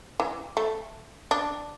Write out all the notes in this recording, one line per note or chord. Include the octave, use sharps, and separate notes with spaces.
E3
A3
D4